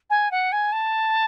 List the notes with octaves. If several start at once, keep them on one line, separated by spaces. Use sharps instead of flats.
G#5
F#5
G#5
A5